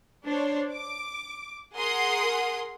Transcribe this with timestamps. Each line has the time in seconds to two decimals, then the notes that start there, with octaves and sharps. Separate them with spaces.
0.25 D4 C5 C#5
0.73 D6
1.77 G#4 A#4 F#5 C6 D#6